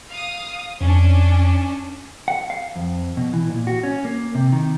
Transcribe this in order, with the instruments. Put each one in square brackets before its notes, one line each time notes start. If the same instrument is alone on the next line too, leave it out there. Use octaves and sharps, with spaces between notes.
[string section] F5 D#6
[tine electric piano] F2 [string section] C#4 D4
[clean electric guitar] F#5
F5
F2
B2
E3
A#2
F#4
C#4
A#3
C3
D#3